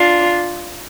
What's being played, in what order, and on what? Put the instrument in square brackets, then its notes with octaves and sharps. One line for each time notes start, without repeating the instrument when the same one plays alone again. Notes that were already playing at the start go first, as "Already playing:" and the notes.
Already playing: [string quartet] D4 F4